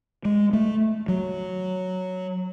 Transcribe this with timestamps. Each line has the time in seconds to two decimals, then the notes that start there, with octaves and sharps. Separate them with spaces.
0.25 G#3
0.53 A3
1.08 F#3